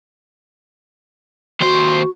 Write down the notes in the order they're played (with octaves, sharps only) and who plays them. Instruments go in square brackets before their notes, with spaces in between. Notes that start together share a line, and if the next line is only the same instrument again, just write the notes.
[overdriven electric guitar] D#2 C5 [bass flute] F#4